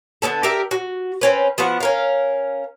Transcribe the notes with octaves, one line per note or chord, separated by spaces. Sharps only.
D3 B3 C#4 A4
G4 A4 A#4 E5
F#4
C4 C#4 B4
F3 B3 F#4 F#5
C#4 A#4 F5